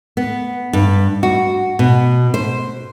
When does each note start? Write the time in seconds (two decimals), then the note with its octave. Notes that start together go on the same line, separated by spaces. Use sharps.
0.17 B3
0.73 G2
1.23 F#4
1.79 B2
2.34 C5